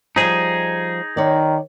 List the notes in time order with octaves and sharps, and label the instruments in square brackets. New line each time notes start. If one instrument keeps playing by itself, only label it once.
[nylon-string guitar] F3 G3 [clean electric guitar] D#4 G#4
[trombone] D#3 [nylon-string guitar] C#5 D5